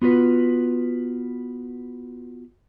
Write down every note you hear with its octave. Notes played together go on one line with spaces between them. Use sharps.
B3 F4 F#4 B4